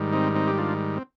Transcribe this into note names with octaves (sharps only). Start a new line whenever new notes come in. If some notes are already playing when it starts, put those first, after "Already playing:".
Already playing: G#2 D#3 G3
C4 D#4
C4 D#4
G4
D4 F4
C4